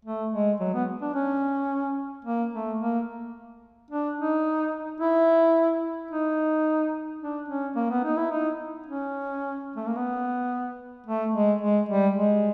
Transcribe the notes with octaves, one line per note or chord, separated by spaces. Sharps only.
A3
G#3
F#3
B3
D4
C#4
A#3
A3
A#3
D4
D#4
E4
D#4
D4
C#4
A#3
B3
D#4
E4
D#4
C#4
A3
A#3
B3
A3
G#3
G#3
G3
G#3